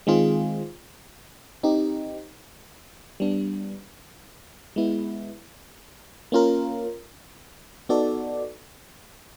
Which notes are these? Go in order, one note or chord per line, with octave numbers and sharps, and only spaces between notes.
D#3 G#3 C4 F4 G#4
C4 D#4 G4
G3 B3 D4
G#3 B3 E4
A#3 C#4 F4 A#4
B3 D#4 F#4 A4 D5